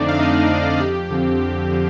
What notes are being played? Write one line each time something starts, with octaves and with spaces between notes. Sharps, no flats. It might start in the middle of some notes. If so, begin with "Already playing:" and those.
Already playing: F2 D3 A3 C4 D4 D#4 D5
F5
F2 D#4 D#5
D3 A3 C4 D#4
F2 G4
D3 F3 C4
F2
D3 F3 C4